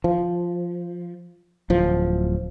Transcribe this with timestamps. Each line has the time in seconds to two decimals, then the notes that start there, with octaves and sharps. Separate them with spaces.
0.04 F3
1.70 D1 F3